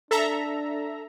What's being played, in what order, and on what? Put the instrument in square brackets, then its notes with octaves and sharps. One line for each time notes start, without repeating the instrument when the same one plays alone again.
[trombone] D4 [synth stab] A4 E5 A#5